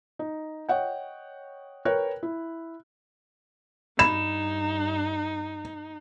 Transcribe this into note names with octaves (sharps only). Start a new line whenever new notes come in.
D#4
C#5 D#5 F#5 G5
A#4 B4 C#5 G5 F#6
E4
G2 D#4 B5 E7